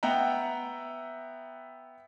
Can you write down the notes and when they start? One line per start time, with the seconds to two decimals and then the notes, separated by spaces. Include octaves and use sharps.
0.03 B3 E5 F#5 G5 A#5